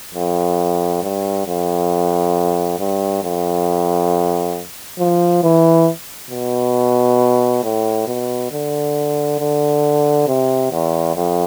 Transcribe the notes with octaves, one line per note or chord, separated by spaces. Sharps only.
F2
G2
F2
G2
F2
F3
E3
B2
A2
B2
D3
D3
C3
E2
F2